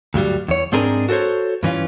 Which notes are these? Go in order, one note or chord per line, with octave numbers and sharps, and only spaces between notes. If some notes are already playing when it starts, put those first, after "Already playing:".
D2 G2 F#3 G3
E2 C#5
G#2 C4 D4 G#4 A#4
F#4 A4 A#4 C5 C#5
G2 E3 C#4 F4